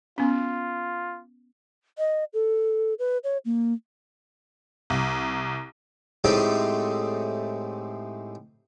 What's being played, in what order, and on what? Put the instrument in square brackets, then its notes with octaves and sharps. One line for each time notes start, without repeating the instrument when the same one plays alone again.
[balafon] B3 C#4 [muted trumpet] F4
[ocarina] D#5
A4
B4
C#5
A#3
[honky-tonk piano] C2
[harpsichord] A2 G#3 A3 C4 D#4 G4